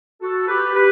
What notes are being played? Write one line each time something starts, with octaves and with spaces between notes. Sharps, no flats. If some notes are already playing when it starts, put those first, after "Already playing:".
F#4 A4
G4 B4
G4 B4